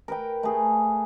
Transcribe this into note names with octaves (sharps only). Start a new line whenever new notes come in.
A#4 B4 G5
A3 G#4